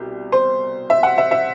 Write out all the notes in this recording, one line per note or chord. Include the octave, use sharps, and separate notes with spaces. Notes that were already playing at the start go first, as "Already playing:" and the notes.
Already playing: C2 B2 G4
C5
E5
F#5
E5
E5